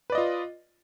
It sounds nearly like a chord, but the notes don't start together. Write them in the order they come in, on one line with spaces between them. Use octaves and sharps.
B4 D5 D#5 F4